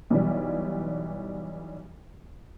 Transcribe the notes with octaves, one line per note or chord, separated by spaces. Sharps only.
B1 E3 G3